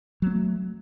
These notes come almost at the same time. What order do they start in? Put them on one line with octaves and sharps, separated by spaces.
F#3 B3 A3